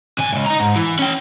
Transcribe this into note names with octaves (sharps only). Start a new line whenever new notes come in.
C3 G#5
C#2 G2
D#4 A#5
G#2
E3
C#4 G5